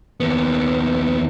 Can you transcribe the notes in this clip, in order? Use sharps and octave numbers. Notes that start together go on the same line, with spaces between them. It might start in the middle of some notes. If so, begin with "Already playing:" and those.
D#2 B3